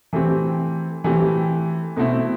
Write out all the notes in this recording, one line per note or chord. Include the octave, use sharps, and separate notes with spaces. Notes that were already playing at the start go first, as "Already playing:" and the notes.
E3 A3 C4 G4
E3 A3 C4 G4
B2 A3 C4 E4